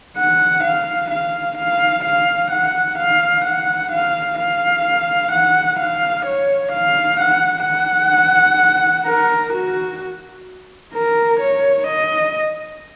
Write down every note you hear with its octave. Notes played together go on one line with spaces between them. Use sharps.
F#5
F5
F5
F5
F5
F#5
F5
F#5
F5
F5
F#5
F5
C#5
F5
F#5
F#5
A#4
F#4
A#4
C#5
D#5